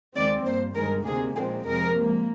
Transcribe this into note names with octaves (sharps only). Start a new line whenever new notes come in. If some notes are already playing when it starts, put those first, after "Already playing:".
D#2 D#3 G#3 C4 D5
G2 F3 A#3 C5
G1 G2 D#3 G#3 A#4
D2 C3 D#3 A#3 G#4
A#1 A#2 G#3 C4 G#4
F2 C3 F3 G#3 A#4
G#2 F3 A#3